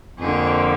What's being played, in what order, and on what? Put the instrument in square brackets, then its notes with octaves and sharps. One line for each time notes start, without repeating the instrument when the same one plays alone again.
[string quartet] F2 D3 F3 A#3 G#4